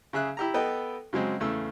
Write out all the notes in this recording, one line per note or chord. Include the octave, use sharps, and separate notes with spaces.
C#3 G#4 E5 F#6
E4 G4 A#5
B3 A4 B4 D#5 G5
C#3 F#3 G#3 C4
E2 C#3 A3 E6